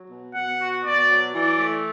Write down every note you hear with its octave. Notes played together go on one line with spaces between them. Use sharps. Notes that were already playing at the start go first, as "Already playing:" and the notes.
Already playing: F#3
B2
B2 F#5
F#4
B2 D5
F#3
E3 D5
A3